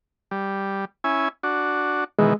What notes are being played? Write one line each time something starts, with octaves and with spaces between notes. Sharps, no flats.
G3
C#4 E4 G#5
D4 F#4
B2 D#3 E3 G#3